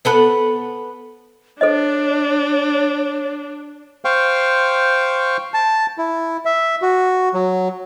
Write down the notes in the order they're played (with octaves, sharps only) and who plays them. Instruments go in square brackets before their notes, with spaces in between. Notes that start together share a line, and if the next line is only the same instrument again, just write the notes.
[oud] B3 A4 B4
[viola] D4 [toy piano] A4 C5 D#5 [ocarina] C#5
[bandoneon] C5 F5 G5 C#6
A5
E4
E5
F#4
F#3